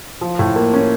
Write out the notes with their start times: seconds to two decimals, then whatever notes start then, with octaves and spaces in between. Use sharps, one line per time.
0.21 F3
0.39 A2
0.56 A#3
0.74 C#4